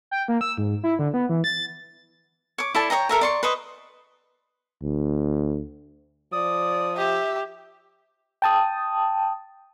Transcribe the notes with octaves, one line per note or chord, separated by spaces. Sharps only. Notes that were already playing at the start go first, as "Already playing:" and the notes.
G5
A#3
E6
G#2
E4
D3
B3
E3
A6
C#5 D6
E4 A4 D5 A5
C#5 D#5 G5 A#5
A4 A#4 E5 A#5
D5 C6 C#6
B4 C5 D#5 C#6
D2
F3 D5 D#6
G4 E5
G5 A5 D#6